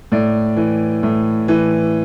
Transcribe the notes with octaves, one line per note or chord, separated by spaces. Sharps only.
A2 D5
E3
A2
E3